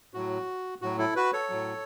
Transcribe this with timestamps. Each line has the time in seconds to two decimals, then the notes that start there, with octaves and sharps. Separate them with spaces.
0.14 A2 F#3 F#4
0.81 A2 F#3 F#4
0.98 E4 A4
1.16 F#4 B4
1.33 A4 C#5
1.50 A2 F#3